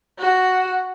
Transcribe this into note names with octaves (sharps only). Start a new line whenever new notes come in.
F#4